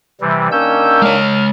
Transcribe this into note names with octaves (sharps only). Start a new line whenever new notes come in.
C3 E3 G3
D#3 A#3 C#4 D4 E6 G6
G#3 C#5 F6